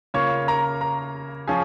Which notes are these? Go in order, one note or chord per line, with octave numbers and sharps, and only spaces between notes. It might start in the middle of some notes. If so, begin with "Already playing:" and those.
C#3 A#3 F4 C#5 C#6
A#4 A#5
A#4 A#5
F3 C#4 F4 G#4 G#5